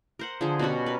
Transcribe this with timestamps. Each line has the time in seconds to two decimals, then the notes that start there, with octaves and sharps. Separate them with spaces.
0.19 A#4 C5 F#5
0.41 D3 F3 G#4 C5
0.59 B2 G3 C#4 F#4
0.86 A#4 B4